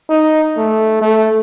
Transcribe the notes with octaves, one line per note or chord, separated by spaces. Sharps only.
D#4
A3
A3